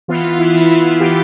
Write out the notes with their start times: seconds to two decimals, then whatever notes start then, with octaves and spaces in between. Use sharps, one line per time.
0.08 E3 B3 F4
0.24 F4
0.39 E4
0.54 E3 B3 F4
0.61 E4
0.76 E4
1.00 E3 B3 G4